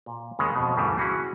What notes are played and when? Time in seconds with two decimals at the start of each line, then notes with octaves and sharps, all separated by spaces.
0.06 A#2
0.39 D#2 C#3 G#3
0.56 F2 B2
0.76 D2 G2 C#3 E3 G3
0.98 C#4 E4 F#4 G#4